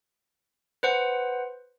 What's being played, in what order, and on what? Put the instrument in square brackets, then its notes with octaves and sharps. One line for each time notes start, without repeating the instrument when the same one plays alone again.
[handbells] B4 C5 F#5